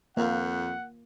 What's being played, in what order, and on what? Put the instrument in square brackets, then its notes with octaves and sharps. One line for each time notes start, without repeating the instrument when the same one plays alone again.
[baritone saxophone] F2 [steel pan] A#3 [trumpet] F#5